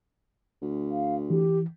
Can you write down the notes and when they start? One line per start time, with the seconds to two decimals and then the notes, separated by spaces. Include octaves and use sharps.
0.62 D2
0.91 F5
1.30 E3 G4